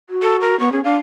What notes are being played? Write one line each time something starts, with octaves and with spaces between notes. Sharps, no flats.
F#4
A4
A#4
B3 C#6
C#4 G#4
D4 F5